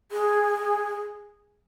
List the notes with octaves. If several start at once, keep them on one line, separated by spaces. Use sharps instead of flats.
G#4